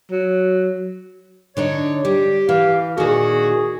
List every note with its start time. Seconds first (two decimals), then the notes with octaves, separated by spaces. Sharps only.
0.11 F#3
1.57 D3 D4 D#4 C#5
2.05 G3 G4
2.49 E3 F5
2.98 A#2 D#3 F#4 G#4